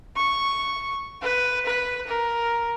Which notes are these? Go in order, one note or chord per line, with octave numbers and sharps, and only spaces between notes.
C#6
B4
B4
A#4